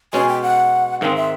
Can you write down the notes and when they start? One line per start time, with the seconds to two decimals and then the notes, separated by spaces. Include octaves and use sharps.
0.13 B2 G#3 C#4 G#5
0.29 G5
0.43 F#5
1.01 G#2 D#3 G#3 C4 F5
1.16 E5